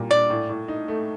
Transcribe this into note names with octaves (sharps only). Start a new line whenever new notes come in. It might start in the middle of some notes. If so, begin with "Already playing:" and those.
Already playing: A#2 G3 A#3
D4 D5
A2
A2
D#4
A3